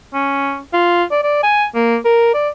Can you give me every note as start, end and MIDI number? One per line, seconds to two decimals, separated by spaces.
0.14 0.59 61
0.73 1.04 65
1.11 1.21 74
1.23 1.43 74
1.44 1.66 80
1.75 1.97 58
2.05 2.34 70
2.34 2.49 74